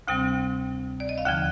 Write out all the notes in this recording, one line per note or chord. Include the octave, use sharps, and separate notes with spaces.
D2 C3 G3 C4 G5
D5
D#5
F5
D#2 D3 F3 G5